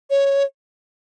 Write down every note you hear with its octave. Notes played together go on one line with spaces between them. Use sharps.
C#5